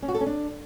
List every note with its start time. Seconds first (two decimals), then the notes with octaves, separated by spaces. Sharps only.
0.02 C#4
0.08 F#4
0.14 A4
0.20 C#4
0.26 D4